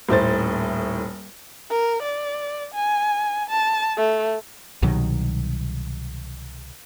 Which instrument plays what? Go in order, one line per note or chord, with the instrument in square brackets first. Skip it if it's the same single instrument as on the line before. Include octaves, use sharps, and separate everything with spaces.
[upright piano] D#1 A2 C5 A6
[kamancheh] A#4
D5
G#5
A5
A3
[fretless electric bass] C2 B2 D#3 F#3